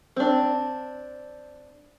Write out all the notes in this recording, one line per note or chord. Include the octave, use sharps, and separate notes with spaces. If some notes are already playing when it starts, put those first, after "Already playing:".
C4 D4